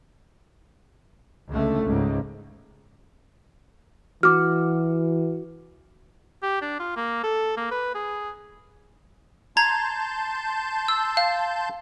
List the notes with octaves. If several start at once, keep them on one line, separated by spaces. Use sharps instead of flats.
C#2 D3 A3
C#2 G#2
E3 F#4 D6 F6
G4
D4
F4
A#3
A4
A#3
B4
G#4
A5 A#5 C6 G6 G#6
E6
F5